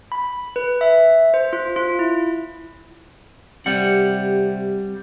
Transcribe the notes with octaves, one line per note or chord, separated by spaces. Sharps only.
B5
B4
E5
C5
F4
F4
E4
C3 G3 F#5